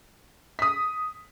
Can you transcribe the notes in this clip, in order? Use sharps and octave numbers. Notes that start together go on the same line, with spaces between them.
D#6 B6